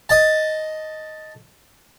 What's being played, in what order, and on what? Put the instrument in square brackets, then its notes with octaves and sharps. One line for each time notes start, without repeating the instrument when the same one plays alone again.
[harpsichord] D#5 A5